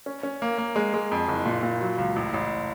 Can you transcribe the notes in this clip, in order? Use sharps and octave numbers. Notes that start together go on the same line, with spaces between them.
C#4
C#4
A#3
A#3
G#3
G#3
F2
F#1
A#2
A#2
F#3
C#2
A1
A1